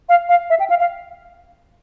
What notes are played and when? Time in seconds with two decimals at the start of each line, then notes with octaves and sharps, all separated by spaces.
0.09 F5
0.29 F5
0.50 E5
0.60 G5
0.70 F5
0.80 F5